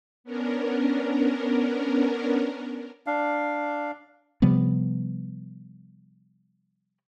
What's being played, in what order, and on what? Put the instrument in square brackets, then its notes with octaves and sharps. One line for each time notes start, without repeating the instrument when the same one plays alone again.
[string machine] B3 C#4 D4 A#4
[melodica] D4 F5
[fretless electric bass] C3 F3 G3 B3